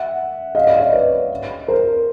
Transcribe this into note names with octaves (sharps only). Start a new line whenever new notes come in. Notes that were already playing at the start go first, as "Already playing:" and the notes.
Already playing: E5 F#5
D#5 F5
D5 E5
C#5 D#5
B4 C#5
A#4 C5